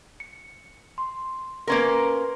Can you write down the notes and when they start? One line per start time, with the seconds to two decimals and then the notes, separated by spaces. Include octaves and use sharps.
0.20 C#7
0.98 C6
1.67 A#3 C#4 A#4 B4 C6